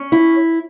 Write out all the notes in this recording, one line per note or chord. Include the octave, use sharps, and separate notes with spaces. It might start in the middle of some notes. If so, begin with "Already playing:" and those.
Already playing: C#4
E4